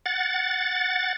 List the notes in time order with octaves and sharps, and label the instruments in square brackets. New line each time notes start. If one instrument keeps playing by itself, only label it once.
[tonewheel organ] F#5 A6